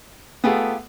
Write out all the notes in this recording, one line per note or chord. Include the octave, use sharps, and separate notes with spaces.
A3 B3 F4 G4 G#4